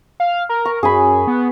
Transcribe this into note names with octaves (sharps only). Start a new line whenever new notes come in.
F5
A#4
C#6
F#2 G#4 G#5 B5
B3